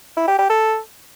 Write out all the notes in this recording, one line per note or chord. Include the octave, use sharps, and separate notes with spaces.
E4
G4
G4
A4